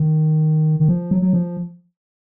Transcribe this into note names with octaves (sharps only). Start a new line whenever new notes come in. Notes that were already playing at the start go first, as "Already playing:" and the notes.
Already playing: D#3
D#3
F3
F#3
F#3
F3